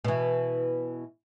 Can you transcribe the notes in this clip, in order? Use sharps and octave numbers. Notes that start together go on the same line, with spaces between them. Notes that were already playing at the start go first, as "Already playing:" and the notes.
B2 E3